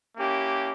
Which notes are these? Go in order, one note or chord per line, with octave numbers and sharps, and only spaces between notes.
A#3 C#4 E4 G4